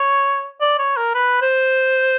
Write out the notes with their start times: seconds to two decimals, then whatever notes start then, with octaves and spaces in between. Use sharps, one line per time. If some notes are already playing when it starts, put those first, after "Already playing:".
Already playing: C#5
0.61 D5
0.79 C#5
0.97 A#4
1.15 B4
1.42 C5